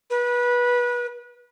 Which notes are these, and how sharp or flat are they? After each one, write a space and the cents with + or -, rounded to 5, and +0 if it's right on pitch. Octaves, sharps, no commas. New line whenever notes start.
B4 -25